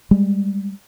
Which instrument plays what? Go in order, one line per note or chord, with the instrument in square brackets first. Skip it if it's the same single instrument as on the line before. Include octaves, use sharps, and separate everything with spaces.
[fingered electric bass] G3 G#3